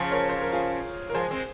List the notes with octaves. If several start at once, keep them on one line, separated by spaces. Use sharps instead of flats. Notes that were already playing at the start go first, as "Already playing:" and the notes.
Already playing: C#3 F3 G#4 C5
A#4 C#5
C5
A#4
F4 G#4
A#4
F3 G#3 G#4 C5
G#3 C4